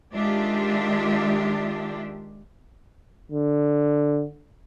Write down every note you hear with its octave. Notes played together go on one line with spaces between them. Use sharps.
D#3 G#3 D4 F4 G4 E5
D3